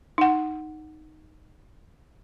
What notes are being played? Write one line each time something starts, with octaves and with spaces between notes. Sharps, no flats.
D#4 F#5